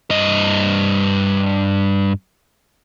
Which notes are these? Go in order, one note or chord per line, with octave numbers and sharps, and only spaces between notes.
G2 D#5